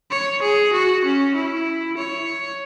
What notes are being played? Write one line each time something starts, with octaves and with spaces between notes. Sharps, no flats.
C#5
G#4
F#4
C#4
E4
C#5